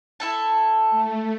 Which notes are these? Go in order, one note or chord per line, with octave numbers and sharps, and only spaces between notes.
E4 A4 A5
A3